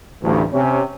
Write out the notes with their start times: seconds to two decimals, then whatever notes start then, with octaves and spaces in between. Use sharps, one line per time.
0.23 A1 D2 G2
0.52 C3 C#4